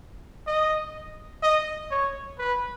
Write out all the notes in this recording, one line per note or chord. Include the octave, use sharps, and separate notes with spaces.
D#5
D#5
C#5
B4